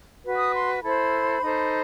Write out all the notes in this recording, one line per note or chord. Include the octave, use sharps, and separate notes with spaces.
F#4 B4
D#6
C6
E4 A4 C5 B5
D#4 A4 C5